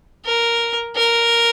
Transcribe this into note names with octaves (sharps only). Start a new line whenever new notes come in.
A#4
A#4